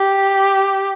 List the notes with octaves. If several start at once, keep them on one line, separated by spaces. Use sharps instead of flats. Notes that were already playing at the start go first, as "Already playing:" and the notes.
Already playing: G4